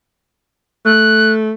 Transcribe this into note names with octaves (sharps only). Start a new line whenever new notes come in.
A3 F#6